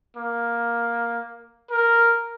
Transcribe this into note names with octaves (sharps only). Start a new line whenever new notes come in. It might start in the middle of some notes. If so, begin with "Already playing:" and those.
A#3
A#4